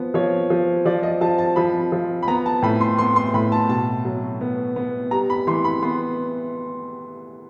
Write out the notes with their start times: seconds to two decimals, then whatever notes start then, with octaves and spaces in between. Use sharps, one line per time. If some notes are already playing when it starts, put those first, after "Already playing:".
Already playing: F3 B3
0.14 F3 C#5
0.50 F3
0.85 F3 D5
1.03 D#5
1.21 F3 A5
1.38 A5
1.56 F3 B5
1.92 F3
2.22 B5
2.28 B3 A#5
2.46 A5
2.62 A2 B5
2.81 C6
2.98 B3 C6
3.16 C6
3.34 A2 B5
3.52 A5
3.69 B2 A5
4.05 F#3
4.41 B3
4.76 B3
5.11 G3 A#5
5.30 B5
5.47 E3 C6
5.64 B5
5.82 B3 C6